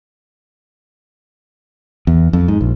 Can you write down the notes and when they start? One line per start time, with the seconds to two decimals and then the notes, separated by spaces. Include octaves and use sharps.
2.07 E2
2.33 F2
2.48 G#2
2.61 A#1